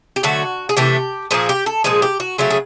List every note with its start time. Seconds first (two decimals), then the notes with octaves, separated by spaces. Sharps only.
0.16 G4
0.23 D3 F#3 A3 F#4
0.69 G#4
0.77 C3 E3 A3 G4
1.31 A#2 F3 A#3 G#4
1.49 G4
1.66 A4
1.84 A#2 F3 G#3 G#4
2.02 G4
2.20 F#4
2.38 C#3 F#3 A3 F4
2.50 G#4